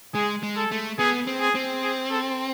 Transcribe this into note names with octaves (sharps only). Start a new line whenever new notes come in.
G#3 G#4
G#3
A4
A3
B3 G#4
C4
G#4
C4
G#4
A4